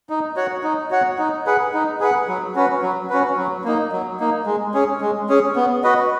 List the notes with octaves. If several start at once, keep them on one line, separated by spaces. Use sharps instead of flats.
D#4
F#4 C#5 F#5
D#4
F#4 C#5 F#5
D#4
G#4 B4 F#5
D#4
G#4 B4 F#5
F#3
C#4 F#4 B4
F#3
C#4 F#4 B4
F#3
A#3 D#4
F#3
A#3 D#4
G#3
C#4 G#4
G#3
C#4 G#4
B3
F#4 B4 D#5